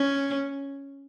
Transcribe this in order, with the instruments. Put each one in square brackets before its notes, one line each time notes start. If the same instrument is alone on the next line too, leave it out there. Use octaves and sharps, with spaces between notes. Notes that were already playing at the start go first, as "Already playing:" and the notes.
Already playing: [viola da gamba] C#4